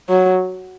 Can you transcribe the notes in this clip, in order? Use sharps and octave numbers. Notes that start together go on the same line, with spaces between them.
F#3